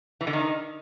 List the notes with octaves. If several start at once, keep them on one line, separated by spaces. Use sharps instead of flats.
E3
D3
D#3